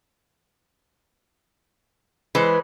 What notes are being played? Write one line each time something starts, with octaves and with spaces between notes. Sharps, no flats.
E3 G#3 B4 C5